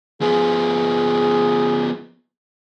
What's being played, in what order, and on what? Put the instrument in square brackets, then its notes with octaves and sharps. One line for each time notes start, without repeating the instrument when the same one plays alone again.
[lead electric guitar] F3 B3 [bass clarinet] G#4